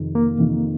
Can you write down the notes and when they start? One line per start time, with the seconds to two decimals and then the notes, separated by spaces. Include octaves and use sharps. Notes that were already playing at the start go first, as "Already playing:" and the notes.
Already playing: F2 C3 D#3
0.15 A#3
0.38 F2 C3 D#3